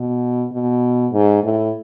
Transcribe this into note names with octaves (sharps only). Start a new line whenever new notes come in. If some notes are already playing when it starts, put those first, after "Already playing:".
Already playing: B2
B2
G#2
A2